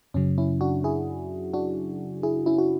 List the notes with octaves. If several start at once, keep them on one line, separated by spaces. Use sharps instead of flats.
F#2 C#3 F#3 C#4
C#4 E4
D4 F#4
E4 G#4
D4 F#4
E4 G#4
C#4 E4
F#4